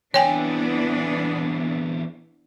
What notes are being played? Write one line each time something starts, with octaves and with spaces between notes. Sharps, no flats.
E2 E3 B3 C4 D4 C#5 G5 G#5